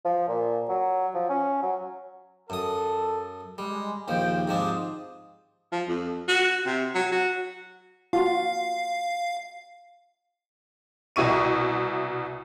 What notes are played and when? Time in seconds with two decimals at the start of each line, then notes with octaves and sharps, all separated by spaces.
0.05 F3
0.28 A#2
0.69 F#3
1.14 F3
1.30 C#4
1.63 F#3
2.50 F#2 A4 D#6
3.58 G3 G#3
4.08 A#1 D#2 F3 G5
4.48 G#2 F3 C4 D4 G4 D#6
5.72 F3
5.88 F2
6.28 F#4
6.65 C3
6.95 F#3
7.12 F#4
8.13 F4 F#4 F5
11.16 C2 B2 E4 C#6 D#7